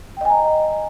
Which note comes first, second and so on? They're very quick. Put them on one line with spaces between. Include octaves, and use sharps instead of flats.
G5 D#5 G#5 A#5